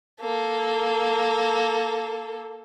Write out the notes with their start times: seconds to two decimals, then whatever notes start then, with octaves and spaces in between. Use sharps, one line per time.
0.21 A#3 A4